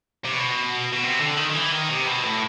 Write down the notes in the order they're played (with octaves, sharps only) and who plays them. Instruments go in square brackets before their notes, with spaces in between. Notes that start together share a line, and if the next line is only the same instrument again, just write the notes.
[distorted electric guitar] C3
B2
B2
C3
D3
D#3
D#3
E3
D#3
C3
B2
A2